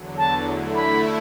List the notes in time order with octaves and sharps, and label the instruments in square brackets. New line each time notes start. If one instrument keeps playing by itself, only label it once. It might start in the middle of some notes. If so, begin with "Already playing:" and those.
Already playing: [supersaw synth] E2 D3 F#3
[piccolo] A5
[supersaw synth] D3 A3 E4
[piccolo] B5